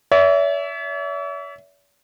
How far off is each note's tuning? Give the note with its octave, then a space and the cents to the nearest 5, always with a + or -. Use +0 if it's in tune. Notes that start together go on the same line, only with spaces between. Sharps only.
C#5 +45 E5 +0